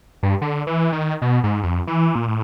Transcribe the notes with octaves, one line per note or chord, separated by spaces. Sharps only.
G2
D3
E3
D#3
B2
G#2
F2
E3
A#2
A2